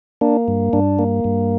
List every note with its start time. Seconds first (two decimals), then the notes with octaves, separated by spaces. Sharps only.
0.21 A#3 D4
0.48 G2
0.73 G2 D4
0.99 A#3
1.24 G2